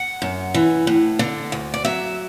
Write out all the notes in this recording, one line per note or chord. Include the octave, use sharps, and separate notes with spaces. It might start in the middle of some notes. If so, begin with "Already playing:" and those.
Already playing: F#5
F#2
E3
A2
D3
D2
D5
F#3 E5